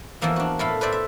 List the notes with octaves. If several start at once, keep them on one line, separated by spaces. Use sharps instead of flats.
E2 E3 F3 A#3 E5
D4 F#4
A2 E4 A4 F5 B5
B4 C5 D5 E5
E5